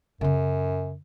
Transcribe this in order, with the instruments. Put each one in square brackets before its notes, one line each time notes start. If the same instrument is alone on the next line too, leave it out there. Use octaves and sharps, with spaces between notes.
[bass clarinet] F#2 [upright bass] C#3 C#4